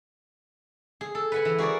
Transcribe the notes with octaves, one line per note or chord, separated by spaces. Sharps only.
G#4
A4
B4 F#5 G#5
E3
F#4 G#4 A#4 D5